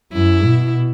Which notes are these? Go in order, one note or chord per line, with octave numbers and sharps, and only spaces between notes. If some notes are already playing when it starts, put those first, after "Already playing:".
F#2 E4
B2